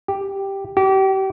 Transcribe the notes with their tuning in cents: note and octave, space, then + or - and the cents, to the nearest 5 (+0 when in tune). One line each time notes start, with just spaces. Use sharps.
G4 +0
G4 -35